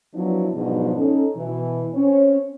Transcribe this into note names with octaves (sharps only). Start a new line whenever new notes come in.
F3 F#3 B3 D4 E4
G#2 B2 F3 F#3 B3 D4
C#4 D#4 A4
B2 E3
C4 C#4 C#5